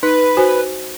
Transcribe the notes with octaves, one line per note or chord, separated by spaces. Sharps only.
D#4 B4
F#4 C5 G#5